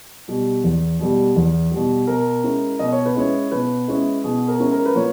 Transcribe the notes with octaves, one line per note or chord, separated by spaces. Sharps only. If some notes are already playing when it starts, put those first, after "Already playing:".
B2 G3
E2
B2 G3
E2
B2 G3
B2 A#4
G#3 C#4 E4
B2 D#5
C#5
B4
G#3 C#4 E4 C#5
B2 B4
G#3 C#4 E4
B2 G#4
A#4
G#3 C#4 E4
A#4
B4
A#2 C#5